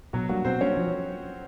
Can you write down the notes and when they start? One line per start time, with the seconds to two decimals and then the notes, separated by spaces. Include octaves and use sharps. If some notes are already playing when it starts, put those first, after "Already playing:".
0.13 B2 F#3 F#4
0.29 F#3 G3 A#3 D4 F#4
0.45 B2 C4 C5
0.61 G3 A#3 C#4 D4 C#5
0.77 F3